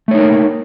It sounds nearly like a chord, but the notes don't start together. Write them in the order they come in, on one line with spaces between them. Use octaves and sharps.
A3 C#5 D#4 A#4 A#3